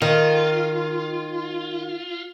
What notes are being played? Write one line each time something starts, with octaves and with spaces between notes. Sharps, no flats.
D#3 F4